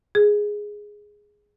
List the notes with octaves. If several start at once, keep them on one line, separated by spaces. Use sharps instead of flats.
G#4